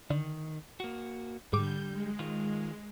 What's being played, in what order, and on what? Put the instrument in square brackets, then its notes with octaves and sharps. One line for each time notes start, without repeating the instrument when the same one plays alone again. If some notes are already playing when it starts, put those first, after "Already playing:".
[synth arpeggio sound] D3 [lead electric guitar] D#3
[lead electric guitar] A#3 F#4
[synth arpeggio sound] G#2 D6 [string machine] D3 G6 [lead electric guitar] G3
[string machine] G#3
[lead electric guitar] D#3 F4